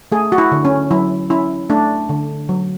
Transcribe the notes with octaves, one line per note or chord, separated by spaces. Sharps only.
A3 G#4
F#4
E4
D3
C#4
F#3 E4
C#4 E4
A3 D4
D3
F#3